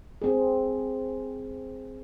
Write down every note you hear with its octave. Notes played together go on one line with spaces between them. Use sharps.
C4 G#4